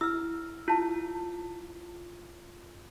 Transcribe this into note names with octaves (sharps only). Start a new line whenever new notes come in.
E4 E6 F6
E4 F4 A5